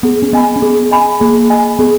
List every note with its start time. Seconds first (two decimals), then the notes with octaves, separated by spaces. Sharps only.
0.03 B3 G#4
0.22 C#4
0.33 B3 D#5 G#5 B5
0.56 C#4
0.62 B3 G#4
0.91 D#5 G#5 B5
1.20 A#3 G#4
1.50 D#5 G#5 B5
1.79 B3 G#4